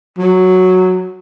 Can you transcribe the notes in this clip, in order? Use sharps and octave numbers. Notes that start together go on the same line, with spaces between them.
F#3